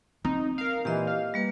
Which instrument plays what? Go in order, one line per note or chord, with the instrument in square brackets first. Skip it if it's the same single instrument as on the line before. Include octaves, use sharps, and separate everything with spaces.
[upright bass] C4 [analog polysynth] D#4
[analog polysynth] A#4 F5
[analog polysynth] A#2 E3 [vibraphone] G4 D#5
[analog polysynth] F5
[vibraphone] G3 A#3 B4